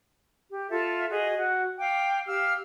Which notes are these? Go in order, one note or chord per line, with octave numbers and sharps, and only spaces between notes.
G4
F4 A4 E5
F#4 G#4 D#5
F#4
F5 G5 D6
G4 F5 E6 F6